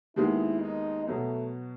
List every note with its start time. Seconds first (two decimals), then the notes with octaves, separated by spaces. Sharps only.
0.16 D#2 D#3 G#3 B3 E4
0.61 D#4
1.07 B2 F#3 A3 B3